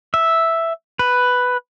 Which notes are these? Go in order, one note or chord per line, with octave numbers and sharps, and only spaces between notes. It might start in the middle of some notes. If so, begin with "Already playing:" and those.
E5
B4